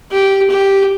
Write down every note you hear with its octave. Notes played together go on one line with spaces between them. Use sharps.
G4
G4